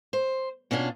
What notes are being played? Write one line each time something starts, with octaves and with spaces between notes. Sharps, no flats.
C5
B2 C#4 D4 F4